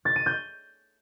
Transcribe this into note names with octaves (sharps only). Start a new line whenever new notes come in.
A6
D#7
G6